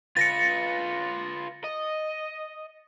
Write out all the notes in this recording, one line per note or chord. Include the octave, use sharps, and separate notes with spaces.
F4 B4 A6 A#6 C#7
D#5